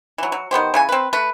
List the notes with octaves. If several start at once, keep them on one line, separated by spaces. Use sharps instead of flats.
E3 F#3
F#3
D#3 B3 G4 C5
C#3 E3 G#5
C4 B4
A3 B4